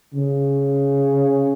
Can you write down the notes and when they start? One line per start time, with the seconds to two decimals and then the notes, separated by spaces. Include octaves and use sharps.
0.14 C#3